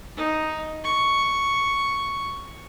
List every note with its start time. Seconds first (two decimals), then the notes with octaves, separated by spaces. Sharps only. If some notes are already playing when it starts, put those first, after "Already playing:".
0.17 D#4
0.84 C#6